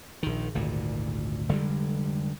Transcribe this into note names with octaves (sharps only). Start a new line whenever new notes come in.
A#1 D#3
G#1 D2 A#2
F1 D3 G3 G#3